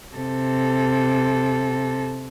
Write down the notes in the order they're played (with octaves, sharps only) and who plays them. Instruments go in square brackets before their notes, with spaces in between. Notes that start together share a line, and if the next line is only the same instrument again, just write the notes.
[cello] C3 A4